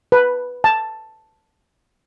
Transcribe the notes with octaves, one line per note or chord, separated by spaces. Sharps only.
B4
A5